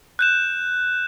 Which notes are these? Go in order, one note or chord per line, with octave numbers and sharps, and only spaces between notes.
F#6 G6 E7